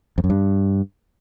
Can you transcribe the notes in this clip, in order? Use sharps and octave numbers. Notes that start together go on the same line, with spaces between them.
F2
F#2
G2